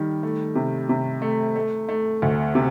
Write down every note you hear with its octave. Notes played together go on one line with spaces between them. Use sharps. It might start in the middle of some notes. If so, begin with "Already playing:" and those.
Already playing: D#3 G3
A3
C3
C3
A3
A3
A3
D2
C3